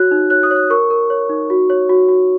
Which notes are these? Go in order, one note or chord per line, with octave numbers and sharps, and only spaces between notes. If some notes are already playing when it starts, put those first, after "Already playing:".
Already playing: F#4 C#5 F#6
D#4
C#5 F#6
D#6
C#5
F#6
A#4 C#6
A#4
C#5
D#4
F#4
C#5
F#4
F#4